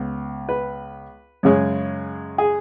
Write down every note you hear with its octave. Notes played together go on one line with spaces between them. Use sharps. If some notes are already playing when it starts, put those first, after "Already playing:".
Already playing: C#2 B3
B4
F#2 C#3 G#3 C#4
G#4